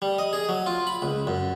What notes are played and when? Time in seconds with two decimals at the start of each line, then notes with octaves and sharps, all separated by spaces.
0.02 G3
0.18 D#5
0.33 G#4
0.49 F#3
0.66 F4
0.87 B5
1.02 C#2
1.27 F#2